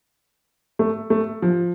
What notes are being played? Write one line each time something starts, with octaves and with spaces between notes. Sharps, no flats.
A3
A3
F3